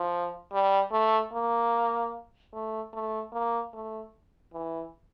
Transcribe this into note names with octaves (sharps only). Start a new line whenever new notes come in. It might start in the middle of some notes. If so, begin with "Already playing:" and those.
Already playing: F3
G3
A3
A#3
A3
A3
A#3
A3
E3